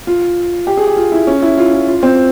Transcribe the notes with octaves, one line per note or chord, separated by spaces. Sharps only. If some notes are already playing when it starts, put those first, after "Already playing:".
F4
G4
G#4
G4
F4
E4
C#4
E4
F4
F4
F4
C4